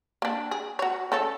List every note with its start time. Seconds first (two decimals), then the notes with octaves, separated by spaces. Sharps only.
0.22 A#3 D4
0.51 G#4
0.79 F#4 C#5
1.12 C#3 A4 C#5